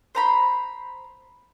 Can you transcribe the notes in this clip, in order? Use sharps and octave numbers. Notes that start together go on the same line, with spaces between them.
C5 A#5 B5